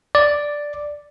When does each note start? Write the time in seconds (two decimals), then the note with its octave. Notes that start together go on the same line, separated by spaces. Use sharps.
0.15 D5